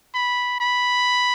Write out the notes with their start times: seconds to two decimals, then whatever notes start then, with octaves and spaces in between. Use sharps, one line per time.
0.15 B5
0.61 B5